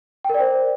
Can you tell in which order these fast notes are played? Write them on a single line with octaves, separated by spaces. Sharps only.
G5 A#4 D5 C5